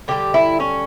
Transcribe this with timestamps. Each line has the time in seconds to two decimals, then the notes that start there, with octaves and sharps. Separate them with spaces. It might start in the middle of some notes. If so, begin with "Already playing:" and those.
0.08 D3 G3 G4
0.34 E4
0.60 C#4